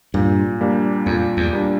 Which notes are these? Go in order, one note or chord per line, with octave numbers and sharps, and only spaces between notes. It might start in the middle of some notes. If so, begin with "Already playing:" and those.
G2 A#2
G3 A#3 D4
F2 A#2
E2
G3 A#3 D4